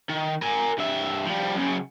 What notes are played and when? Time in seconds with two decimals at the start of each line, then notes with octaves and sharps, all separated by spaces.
0.10 D#3
0.42 A#4 G#5
0.78 G2 E5
1.26 F3 G3
1.55 F#2 C#3